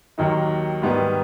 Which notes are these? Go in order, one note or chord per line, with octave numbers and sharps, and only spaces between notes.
D#2 D#3 F#3 A#3 D#4
G#2 D#3 G3 B3